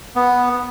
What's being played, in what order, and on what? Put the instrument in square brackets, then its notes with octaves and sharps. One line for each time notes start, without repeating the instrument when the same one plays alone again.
[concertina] B3